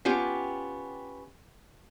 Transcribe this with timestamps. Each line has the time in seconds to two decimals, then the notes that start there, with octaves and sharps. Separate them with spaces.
0.05 B3 C#4 F4 G4